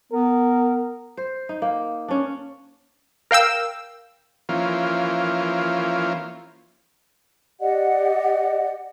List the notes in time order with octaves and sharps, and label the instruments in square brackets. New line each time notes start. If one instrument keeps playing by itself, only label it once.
[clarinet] B3 [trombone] A#4
[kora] C5
D#4
A#3
C#4 D4
[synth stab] A#4 F5 G5 E6
[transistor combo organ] E3 F3 A#3 C#4 F4
[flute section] G4 D5 D#5 F#5